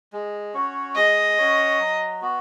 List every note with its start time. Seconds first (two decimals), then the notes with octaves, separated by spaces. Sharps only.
0.13 G#3
0.54 C#4 F#4 C#5
0.96 G#3 D#5
1.38 C#4 F#4 C#5
1.79 F#3
2.22 B3 F#4